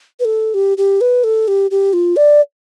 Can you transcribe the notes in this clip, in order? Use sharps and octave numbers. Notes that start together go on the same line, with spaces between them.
B4
A4
G4
G4
B4
A4
G4
G4
F4
D5